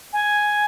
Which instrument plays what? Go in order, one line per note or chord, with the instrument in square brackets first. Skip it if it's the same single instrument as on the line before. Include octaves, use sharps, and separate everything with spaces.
[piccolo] G#5